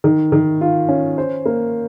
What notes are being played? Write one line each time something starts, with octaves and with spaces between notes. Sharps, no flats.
D#3
D#3
F4
C#4
C5
A#3